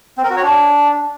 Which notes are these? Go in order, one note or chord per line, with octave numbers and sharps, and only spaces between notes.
C4
A#4
F#4
C#5
D4